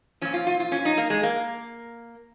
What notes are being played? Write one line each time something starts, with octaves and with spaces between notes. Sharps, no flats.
A#2 F3 C#4
F4
F4
F4
C#4
D#4
A#3
G#3
A#3